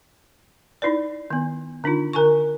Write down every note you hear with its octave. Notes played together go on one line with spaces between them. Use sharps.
D#4 E4 B4 D5
D#3 B3
D3 D4 D#4 F4
D3 A#4 G#5 A5 C#6